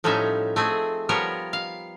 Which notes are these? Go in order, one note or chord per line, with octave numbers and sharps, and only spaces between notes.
A2 F3 G3 C#4 D#4 E5
A3 C4 G#4
F3 G3 B3 A#4 C#5
F5